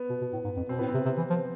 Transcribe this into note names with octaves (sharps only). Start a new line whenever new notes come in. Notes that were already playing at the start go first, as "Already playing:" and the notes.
Already playing: B3
B2
B2
A2
G#2
F2
B2 C4
A2 B3
C4
C3
C3
E3
F3